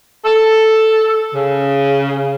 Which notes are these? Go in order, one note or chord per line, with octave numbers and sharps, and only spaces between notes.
A4
C#3